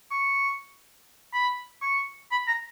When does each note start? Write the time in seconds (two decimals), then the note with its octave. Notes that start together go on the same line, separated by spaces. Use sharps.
0.11 C#6
1.33 B5
1.82 C#6
2.32 B5
2.48 A#5